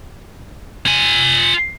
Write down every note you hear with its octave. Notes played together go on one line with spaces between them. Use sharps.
F4 G#5